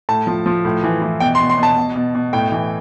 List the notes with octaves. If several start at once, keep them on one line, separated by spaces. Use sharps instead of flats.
A2 A5
F3
F3
A2
E3
E3
B2 G5
C6
B2
C6
B2 A5
B2
B2
B2
A2 G5
E3